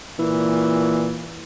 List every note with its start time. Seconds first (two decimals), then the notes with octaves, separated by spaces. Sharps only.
0.19 A#2 E3